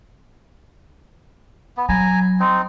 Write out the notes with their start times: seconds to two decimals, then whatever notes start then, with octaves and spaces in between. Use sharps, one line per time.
1.77 B3
1.89 F#3 G#5 A#5
2.40 C4 D#4